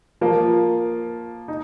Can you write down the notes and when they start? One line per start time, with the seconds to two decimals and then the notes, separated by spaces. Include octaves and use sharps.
0.21 F3 A#3 F4
1.48 D#4